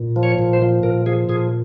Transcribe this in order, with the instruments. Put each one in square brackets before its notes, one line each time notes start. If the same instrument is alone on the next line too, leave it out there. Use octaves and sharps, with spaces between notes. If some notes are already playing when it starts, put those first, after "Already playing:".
Already playing: [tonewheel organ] A#2
F3
C#5
A#2
C5
F3
A#2 A#4
F3 G#4
A#2 G#4